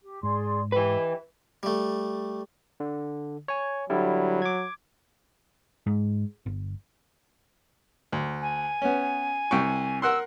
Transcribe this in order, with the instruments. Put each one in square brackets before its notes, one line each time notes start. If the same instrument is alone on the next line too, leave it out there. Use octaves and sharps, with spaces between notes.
[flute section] G4
[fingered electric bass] G#2 [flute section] G#4 D5 C6
[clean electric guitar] E3 B4 [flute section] G4 D#5 G5
[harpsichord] G3 A3
[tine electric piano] D3
C#5 G#5
[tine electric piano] D3 G3 E4 [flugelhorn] F#3
[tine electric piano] D6 G#6
[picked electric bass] G#2
G1
[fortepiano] D2
[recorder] G#5
[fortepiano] B3 C#4
C2 G5 C#6
[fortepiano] A#4 F#5 C6 [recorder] E6